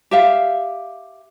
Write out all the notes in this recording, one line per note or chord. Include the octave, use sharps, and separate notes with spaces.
G4 E5 F5